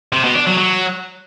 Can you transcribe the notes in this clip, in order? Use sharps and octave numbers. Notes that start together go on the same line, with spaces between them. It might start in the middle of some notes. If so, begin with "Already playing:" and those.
C3
B2
D4
F#3
F#3